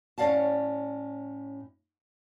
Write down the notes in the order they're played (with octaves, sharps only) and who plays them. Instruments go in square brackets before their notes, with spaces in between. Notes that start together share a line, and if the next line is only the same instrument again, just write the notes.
[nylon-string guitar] A2 C#4 D5 F5 F#5 A5